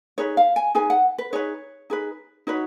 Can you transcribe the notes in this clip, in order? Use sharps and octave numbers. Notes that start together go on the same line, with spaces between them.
D#4 G#4 B4 C#5
F5
G#5
D#4 G#4 B4 G#5
F#5
B4
D#4 G#4 B4 C#5
D#4 G#4 B4
D#4 F#4 B4 C#5